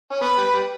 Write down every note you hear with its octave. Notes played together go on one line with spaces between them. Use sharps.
C#4
B3 B4
G3
G3